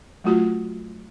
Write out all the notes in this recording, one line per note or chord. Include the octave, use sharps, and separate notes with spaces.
F#3 A3 F4 F#4